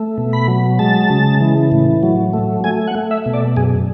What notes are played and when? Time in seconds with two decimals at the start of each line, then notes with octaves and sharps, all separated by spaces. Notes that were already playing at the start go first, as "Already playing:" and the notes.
Already playing: A3
0.18 B2
0.33 B5
0.48 F#3
0.79 G#3 A5
1.10 C#3
1.41 E3
1.72 A2
2.03 F#3
2.33 A3
2.64 A3 G#5
2.88 F#5
2.95 A3
3.11 E5
3.26 B2
3.34 D5
3.57 F#2 G#4